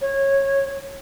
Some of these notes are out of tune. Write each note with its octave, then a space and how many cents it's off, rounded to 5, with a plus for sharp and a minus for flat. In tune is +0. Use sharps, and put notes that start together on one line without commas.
C#5 -20